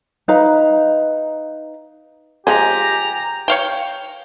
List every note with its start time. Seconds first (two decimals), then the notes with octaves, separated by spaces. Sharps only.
0.28 D#4 B4 F5 A#5
2.47 F3 G#3 G4 C5 G#5 A#5
3.48 C#5 F5 G5